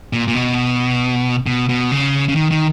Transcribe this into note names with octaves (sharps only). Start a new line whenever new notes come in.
A#2
A#2
B2
B2
B2
C#3
C#3
D#3
D#3